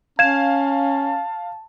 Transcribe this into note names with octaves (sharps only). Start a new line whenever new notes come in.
C#4 F5 A5 G#6 E7